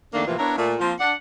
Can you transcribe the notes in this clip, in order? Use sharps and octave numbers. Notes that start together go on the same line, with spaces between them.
F2 D#3 A3 A#3 D4
A2 C3 E3 F3 A#3 F4
B3 D4 E4 A#4 C#5
A#2 A3
F3 A#3 C4 F4
D4 F#5